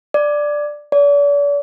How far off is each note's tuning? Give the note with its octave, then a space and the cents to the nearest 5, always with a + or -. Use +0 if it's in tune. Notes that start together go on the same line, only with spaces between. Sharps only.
D5 +5
D5 -40